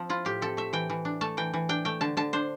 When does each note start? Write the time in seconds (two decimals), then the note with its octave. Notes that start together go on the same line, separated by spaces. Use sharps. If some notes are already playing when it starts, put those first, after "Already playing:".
Already playing: F3 C4
0.09 E4 F4
0.25 A2 G4
0.42 C4 A4
0.57 A3 E5
0.73 E3 G5
0.90 E3
1.05 D4
1.21 A3 A5
1.37 E3 G5
1.54 E3
1.69 D4 G5
1.85 A3 G5
2.01 D3 A5
2.17 D3 A5
2.33 D4 C5